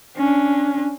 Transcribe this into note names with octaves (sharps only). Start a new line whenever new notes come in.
C#4 D4